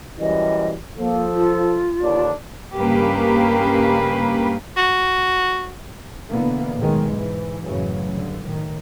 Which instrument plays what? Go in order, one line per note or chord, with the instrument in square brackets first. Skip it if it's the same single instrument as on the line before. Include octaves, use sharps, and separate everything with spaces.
[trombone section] F#2 E3 G3 [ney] D#5
[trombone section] F3 A4 [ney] A#3
[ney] F4
[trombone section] D#2 D3 D4
[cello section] G2 C#3 A#3 G4 B4
[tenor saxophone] F#4
[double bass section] B2 D3 E3 A#3 B3
B1 E2 A2 D#3 G#3
G#2 E3
F#2 A2 C#3 E3 F#3
G2 D3
A2 D#3